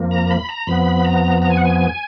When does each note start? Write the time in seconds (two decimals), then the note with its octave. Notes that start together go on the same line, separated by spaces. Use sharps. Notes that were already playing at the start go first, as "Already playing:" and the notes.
Already playing: F2 F3 A#3
0.11 A#5
0.30 B5
0.49 A#5
0.67 F2 F3 B3 B5
1.05 A#5
1.42 A#5
1.50 G#5
1.57 F#5
1.65 G#5